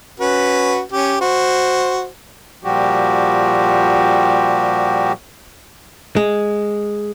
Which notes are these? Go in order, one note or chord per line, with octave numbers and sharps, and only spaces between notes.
C#4 F#4 B4
C#4 G4
F#4 C5
A#2 F3 G3 F#4 G4
G#3